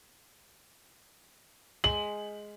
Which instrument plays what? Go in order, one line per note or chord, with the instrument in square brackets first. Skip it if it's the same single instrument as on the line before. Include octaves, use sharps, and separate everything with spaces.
[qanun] G#3 [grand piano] F#7